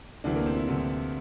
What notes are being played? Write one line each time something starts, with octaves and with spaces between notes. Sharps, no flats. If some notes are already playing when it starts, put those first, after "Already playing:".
D2 C3 E3 D4
A#3
C4
E4
D2 C3 E3